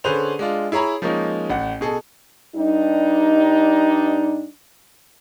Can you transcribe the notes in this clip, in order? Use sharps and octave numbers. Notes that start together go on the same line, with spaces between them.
D3 C#4 G#4 B4 C5 F7
G#3 D4 F4
E4 G#4 C#5 A#5 B5
F3 G#3 A#3 C#4 D#4
A1 F#5
B2 G#4 A4
G2 G3 D4 D#4